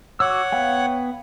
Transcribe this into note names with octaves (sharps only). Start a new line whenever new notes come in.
F#4 C#5 F#5 D6 E6
B3 F5 G5